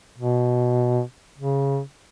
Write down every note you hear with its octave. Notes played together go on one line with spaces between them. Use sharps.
B2
C#3